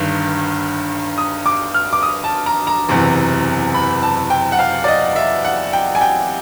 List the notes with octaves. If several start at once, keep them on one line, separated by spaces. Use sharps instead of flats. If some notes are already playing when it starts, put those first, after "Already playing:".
Already playing: G1 G2 D#3
D#6
D6
F6
D6
D#6
A5
A#5
A#5
F#1 E2 C3 E3
B5
A5
G5
F#5
F5
D5
D#5
E5
F#5
G5
G#5
G5